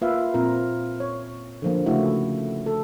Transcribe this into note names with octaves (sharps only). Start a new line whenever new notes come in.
A#3 F4 B4 E5 F5
A#2 C4 F4 A#4
C#5
D3 F3 A#3
C#3 A3 E4 F#4
A4